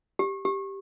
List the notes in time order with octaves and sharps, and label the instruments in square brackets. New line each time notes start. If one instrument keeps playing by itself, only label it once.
[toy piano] G4
G4